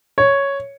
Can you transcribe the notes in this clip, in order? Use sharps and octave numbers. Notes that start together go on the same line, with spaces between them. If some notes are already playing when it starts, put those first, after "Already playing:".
C#5